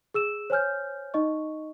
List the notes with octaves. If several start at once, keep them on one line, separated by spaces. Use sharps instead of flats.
G#4 E6 E7
C5 C#5 G#5 F6 G6
D#4 D#5 C#6